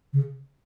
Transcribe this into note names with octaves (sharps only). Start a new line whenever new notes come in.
C#3